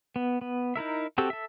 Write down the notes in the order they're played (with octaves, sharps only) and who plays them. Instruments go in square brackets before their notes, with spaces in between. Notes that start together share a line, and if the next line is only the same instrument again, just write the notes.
[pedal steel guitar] B3
B3
D#4 E4 A#4 E5
C4 F#4 G4 A4 E6
A4 E5